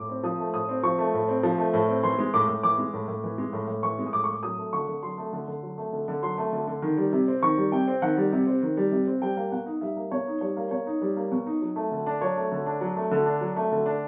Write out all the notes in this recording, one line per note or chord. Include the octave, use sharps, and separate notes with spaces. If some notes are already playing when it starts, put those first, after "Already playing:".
Already playing: A2 D6
C4
F3 D#6
A3
A2 D#6
C4
F3 C#6
A3
A2
C4
F3
A3
A2
C4
E3 C6
G#3
A2 D6
A2
E3 D6
G#3
A2
A2
E3
G#3
A2
A2
E3 C#6
G#3
D#6
A2 D6
A2 C#6
D6
F#3 D#6
A3
D3 C#6
D3
F#3 C6
A3
D3
D3
F#3
A3
D3
D3
F#3 C6
A3
D3
D3
D#3
G3
C3
C4
D#3 C#6
G3
C3 G5
C4
D#3 F#5
G3
C3
C4
D#3
G3
C3
C4
G3 G5
A#3
B2 F#5
D#4
G3 E5
A#3
B2 C#5
D#4
G3 C#5
A#3
B2 C#5
D#4
G3
A#3
B2
D#4
F#3
A3
D3
D4
F#3 C#5
A3
D3
D4
F#3
A3
D3
D4
F#3
A3
D3
D4